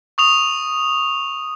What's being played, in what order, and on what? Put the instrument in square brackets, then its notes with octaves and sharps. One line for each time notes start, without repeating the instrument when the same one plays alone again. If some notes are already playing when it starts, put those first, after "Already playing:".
[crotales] C#6 D#6 F7